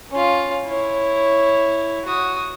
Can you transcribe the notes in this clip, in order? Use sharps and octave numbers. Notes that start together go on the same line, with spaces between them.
C#4 F4
E4 C#5
F#4 D#6